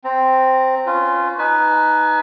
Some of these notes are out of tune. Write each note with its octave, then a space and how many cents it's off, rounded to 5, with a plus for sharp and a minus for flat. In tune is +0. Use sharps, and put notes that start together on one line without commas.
C4 +0 A#5 -20
C#4 +0 F4 +0 B4 +35
D#4 +0 B4 +0 G#5 +45